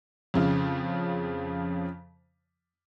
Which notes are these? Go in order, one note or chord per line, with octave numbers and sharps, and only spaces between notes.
F2 C#3 F3